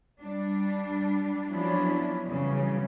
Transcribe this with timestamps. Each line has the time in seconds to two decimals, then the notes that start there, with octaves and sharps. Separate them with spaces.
0.20 G3 D4
1.51 F3 F#3 B3 C#4 D4 E4
2.31 C#3 E3 F#3 G3